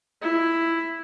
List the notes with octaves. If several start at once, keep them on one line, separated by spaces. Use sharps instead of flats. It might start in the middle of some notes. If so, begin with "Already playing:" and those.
E4